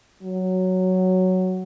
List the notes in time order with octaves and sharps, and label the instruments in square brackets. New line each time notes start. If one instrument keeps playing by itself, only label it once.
[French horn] F#3